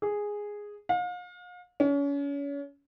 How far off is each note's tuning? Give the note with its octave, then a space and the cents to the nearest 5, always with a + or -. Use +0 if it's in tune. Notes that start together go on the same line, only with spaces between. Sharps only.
G#4 -5
F5 +40
C#4 +35